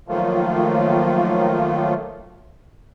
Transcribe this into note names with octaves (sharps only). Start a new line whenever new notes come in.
D#3 F3 F#3 A3 A#3 F4